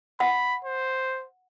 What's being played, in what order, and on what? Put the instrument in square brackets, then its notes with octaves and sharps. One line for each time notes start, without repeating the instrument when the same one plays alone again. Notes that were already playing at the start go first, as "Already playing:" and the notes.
[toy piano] F#5 [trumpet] B5
[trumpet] C5